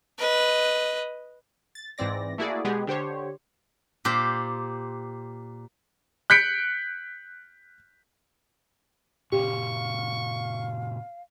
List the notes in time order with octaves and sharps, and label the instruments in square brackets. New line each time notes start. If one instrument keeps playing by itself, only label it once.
[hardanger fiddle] B4 D#5
[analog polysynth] A6
G#2 E3 C4 D5 A#6
A3 A#3 E4 F#4 G#4 D5
B2 G#3 B3 G4 G#4
D3 G4 C5 C#5
[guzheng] A#2 G4 C5
[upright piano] F#6 G6 B6 C#7 D7
[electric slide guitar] A#2 C#3 C#4 [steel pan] G4 [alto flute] F5 [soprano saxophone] C#6